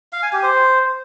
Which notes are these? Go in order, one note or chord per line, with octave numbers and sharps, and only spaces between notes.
F5
G#5
G4
C5